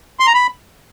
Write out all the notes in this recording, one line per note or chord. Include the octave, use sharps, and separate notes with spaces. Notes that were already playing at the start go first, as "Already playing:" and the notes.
C6
A#5
B5